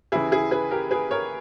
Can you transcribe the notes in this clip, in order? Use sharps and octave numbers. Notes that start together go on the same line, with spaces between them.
D#2 C#3 E3 E4 G#4
E4 G#4
G#4 B4
G4 A#4
G#4 B4
A#4 C#5